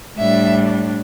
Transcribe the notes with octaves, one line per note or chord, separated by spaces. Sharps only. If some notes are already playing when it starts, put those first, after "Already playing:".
A2 G3 D4 E5